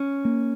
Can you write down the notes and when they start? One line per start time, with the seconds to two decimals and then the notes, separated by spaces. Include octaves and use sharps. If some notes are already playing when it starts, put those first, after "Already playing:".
Already playing: C#4
0.25 A#3